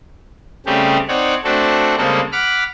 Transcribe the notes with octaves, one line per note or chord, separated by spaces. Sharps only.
C#3 G3 A3 C4 G4 G#4
C4 D#4 C#5 D5 F#5
A3 C4 D4 F#4 A4
C#3 G3 G#3 A#3 C4 A4
F#5 B5 D6 F6